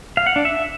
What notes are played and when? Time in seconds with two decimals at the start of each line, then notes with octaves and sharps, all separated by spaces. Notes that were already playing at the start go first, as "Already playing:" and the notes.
0.17 F5
0.27 F#5
0.36 D4
0.45 E5